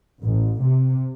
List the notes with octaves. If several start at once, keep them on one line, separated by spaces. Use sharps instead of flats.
A1
C3